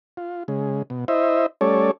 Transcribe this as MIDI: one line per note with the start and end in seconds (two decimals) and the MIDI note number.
0.17 0.43 65
0.48 0.82 49
0.48 0.82 56
0.90 1.05 47
1.08 1.46 64
1.08 1.46 72
1.08 1.46 75
1.08 1.46 76
1.61 1.91 55
1.61 1.91 57
1.61 1.91 61
1.61 1.91 69
1.61 1.91 73
1.61 1.91 74